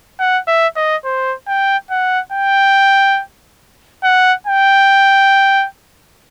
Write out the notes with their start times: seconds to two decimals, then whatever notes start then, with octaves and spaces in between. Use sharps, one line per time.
0.19 F#5
0.47 E5
0.76 D#5
1.05 C5
1.47 G5
1.90 F#5
2.32 G5
4.04 F#5
4.47 G5